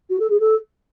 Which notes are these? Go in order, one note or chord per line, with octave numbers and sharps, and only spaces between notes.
F#4
A4
G#4
A4